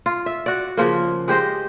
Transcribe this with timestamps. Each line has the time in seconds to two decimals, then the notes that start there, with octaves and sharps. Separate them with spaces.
0.06 F4
0.26 E5
0.46 F#4 D5
0.77 C#3 F3 A#3
1.28 G#3 G4 C5 D#5